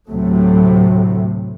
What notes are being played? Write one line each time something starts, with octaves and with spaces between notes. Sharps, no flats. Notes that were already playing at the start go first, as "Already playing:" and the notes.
D2 A2 C3 F#3 A3